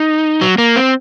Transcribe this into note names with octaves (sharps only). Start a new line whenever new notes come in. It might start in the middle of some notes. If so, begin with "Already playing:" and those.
Already playing: D#4
F#3
A#3
C4